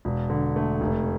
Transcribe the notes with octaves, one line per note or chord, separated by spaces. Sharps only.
E1
D3
A3
F1